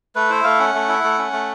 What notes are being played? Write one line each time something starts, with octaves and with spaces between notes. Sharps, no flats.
A3 B4
E4 C5
A3 F5
C#4 F#5
A3
E4
A3
C#4
A3